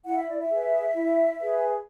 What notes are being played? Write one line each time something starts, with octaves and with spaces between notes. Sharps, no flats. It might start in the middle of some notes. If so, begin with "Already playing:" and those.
E4 F#5
E5
D5
E5
G#4 B4
E4
G#4 B4